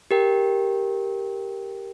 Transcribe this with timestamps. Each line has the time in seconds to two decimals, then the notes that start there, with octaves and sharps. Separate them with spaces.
0.11 G4 A#4 G5